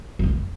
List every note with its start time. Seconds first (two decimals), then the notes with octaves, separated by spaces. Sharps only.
0.19 F2
0.24 E2